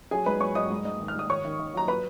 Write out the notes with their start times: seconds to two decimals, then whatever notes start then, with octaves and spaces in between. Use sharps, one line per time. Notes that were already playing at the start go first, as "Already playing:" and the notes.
0.11 F#3 G#4 G#5
0.26 G#2 B4 B5
0.40 F#3 C#5 C#6
0.55 F#3 D#5 D#6
0.70 G#2
0.85 G#2
1.00 D#3
1.08 F6
1.15 G#2 D#6
1.30 D#2 C#5 C#6
1.45 D#3
1.59 D#3
1.74 F#3 A#5
1.88 B4 B5